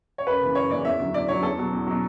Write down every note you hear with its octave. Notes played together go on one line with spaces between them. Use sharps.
C#5
F#2 B4
C#3 E3
F#2 C#5
C#3 E3 D5
E2 E5
D3 F#3
E2 D5
D3 F#3 C#5
E2 A4
B2 F#3
E2
B2 F#3